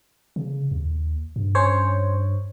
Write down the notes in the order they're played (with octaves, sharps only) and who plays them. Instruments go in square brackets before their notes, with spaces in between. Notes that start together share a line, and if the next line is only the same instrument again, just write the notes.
[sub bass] C#3
D#2
G2
[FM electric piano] C#4 C5 C#5